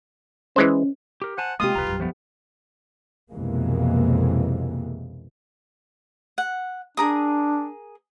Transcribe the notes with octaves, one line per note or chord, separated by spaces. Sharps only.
E3 G#3 C#4 C5
G4 A#4
C5 F#5 G#5 A5
C3 G#3 A#3 F4 G4 D#6
D#1 C2 B4 A#5
B1 F#2 G3
F3 A3 B3
B1 F2 C3 E3 G#3 A#3
F#5
D4 G#4 A#4 D#6